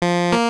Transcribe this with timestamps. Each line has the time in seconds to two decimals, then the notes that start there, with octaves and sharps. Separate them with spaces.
0.02 F3
0.32 A#3